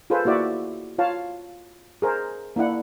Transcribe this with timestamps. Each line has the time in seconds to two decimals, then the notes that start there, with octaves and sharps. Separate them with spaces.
0.10 F4 G#4 A4 B4 C5
0.25 A#3 E4 F#4 D5 E5
0.98 F4 C#5 F5 A5
2.02 G#4 A#4 C5
2.56 A#3 D4 E4 F#5